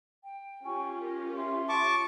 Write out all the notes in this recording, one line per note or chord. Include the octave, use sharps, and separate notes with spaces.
G5
C#4 F4 G4 G5 G#5 C#6
A#4
E5 C6
A5 C#6 D6